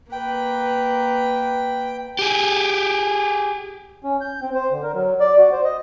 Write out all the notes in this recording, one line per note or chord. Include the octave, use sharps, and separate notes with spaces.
A#3 B4 G5
G4 G#4
C#4
G6
C4
C5
D3
A#4
F#3
D5
F#4
C5
D#5